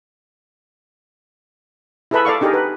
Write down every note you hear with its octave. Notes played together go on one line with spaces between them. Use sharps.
E4 G#4 A4 B4 E5 B5
A4 D5 F5 C#6
D4 D#4 G4 G#4 A#4
B4